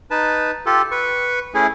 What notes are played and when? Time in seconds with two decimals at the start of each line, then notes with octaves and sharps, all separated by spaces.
0.11 D#4 B4 A5
0.66 F4 G4 A4
0.91 B4 C#6
1.54 A3 C#4 E4 G#4